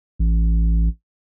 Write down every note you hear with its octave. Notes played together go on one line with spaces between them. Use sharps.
A1